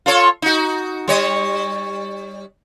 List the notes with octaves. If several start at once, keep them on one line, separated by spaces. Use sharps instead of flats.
F4 A4 C#5
D#4 F#4
G3 C#5 D#5